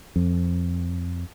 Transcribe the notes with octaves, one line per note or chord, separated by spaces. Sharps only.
F2